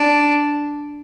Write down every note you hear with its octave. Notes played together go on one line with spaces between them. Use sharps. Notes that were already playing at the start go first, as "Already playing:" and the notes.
Already playing: D4